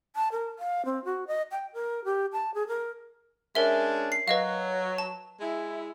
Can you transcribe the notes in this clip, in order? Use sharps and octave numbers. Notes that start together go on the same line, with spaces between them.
A5
A#4
F5
C4
F#4
D#5
G5
A#4
G4
A5
G#4
A#4
G#3 C#4 D4 A#4 E5
C7
F#3 B4 D#5 F5
A5
G#3 E4